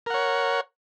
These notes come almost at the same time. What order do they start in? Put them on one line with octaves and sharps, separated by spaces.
A#4 F#5 C#5